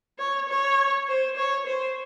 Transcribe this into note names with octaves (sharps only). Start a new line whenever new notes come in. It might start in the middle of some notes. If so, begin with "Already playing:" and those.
C#5
C#5
C5
C#5
C5